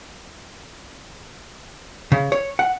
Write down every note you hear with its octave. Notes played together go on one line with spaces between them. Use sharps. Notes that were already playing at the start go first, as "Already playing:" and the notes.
C#3
C#5
F#5